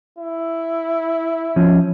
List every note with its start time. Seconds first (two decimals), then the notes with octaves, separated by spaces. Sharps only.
0.19 E4
1.56 F3 C#4